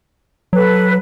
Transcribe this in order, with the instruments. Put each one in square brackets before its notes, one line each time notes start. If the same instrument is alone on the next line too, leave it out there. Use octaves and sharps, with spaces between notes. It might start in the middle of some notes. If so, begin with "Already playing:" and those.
[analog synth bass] F#3 [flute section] A4 B4